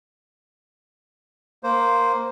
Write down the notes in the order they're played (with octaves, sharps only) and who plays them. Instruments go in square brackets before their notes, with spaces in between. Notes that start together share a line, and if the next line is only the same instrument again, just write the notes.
[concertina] A#3 C5